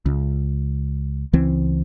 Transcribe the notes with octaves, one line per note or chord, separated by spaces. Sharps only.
C#2
C#2 E3 C4